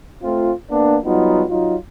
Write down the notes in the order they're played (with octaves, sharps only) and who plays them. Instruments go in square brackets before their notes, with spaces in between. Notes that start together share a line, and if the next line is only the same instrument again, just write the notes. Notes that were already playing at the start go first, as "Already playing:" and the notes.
[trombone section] A3 C4 F4
A#3 B3 D4
F#3 G3 B3 D#4 F4
F#3 D#4 F4